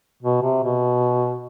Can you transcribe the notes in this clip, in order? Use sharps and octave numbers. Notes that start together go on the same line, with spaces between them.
B2
C3
B2